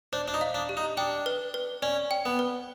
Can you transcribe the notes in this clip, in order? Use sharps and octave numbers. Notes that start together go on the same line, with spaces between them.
D4 C5
D4
D#4
F5
D4
G4
D#4
D4 G5
B4
B4
C#4 D5
G5
B3
B4